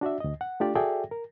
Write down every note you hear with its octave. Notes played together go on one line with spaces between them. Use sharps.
D4 F#4 D5 E5
D2 D#5
F#5
A3 D4 F4 G4 D5
F#4 G#4 A4 D5 E5 G5
A#4